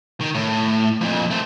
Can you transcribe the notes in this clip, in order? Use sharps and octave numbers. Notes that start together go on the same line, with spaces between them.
D#3
A2
F2 A#2
A3 C4